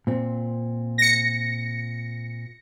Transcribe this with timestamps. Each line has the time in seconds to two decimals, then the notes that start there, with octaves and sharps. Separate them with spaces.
0.07 A#2 C4
0.98 A#6 C#7